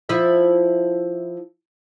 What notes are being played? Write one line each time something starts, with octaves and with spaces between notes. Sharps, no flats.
F3 E4 E5